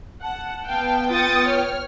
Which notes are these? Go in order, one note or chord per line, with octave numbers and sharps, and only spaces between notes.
F#5 A5
B3 F5 G5
F4 D#6 A6 C#7
C#5 F6